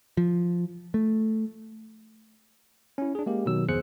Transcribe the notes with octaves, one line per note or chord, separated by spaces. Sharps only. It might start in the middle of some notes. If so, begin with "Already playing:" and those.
F3
A3
C#4 E4
D4 G#4
G#3 A#3 G4
B2 D#3 F#3 E6
G1 E2 G#4 C5 F#6 C#7